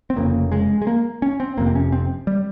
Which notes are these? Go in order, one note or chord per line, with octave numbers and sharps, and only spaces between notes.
C4
F1 F2 C#3 A#3
G#3
G#3
A#3
C#4
C4
F1 F2 C3 A#3
C4
C#4
C4
G3